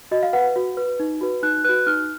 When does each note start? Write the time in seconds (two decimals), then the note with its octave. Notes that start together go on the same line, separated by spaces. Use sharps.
0.11 F#4 D#5
0.23 F5
0.33 B4 F#5
0.56 F#4
0.77 B4
1.00 D#4
1.21 F#4 B4
1.43 D#4 F#6
1.64 F#4 B4 F#6
1.86 D#4 F6